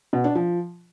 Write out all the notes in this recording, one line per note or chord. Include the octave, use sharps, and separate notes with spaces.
B2
D4
F3